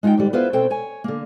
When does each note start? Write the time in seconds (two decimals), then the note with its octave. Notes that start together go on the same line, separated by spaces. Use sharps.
0.03 G#3 D#4 F4 F#5 G5
0.17 G#2 D3 G3
0.33 B3 E4 F4 B4 C5 E5
0.53 B2 C4 A4 C5 C#5 G5
0.70 C#5 G#5
1.04 D3 A#3